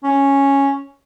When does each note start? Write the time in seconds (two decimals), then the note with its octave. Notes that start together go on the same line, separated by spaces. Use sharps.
0.03 C#4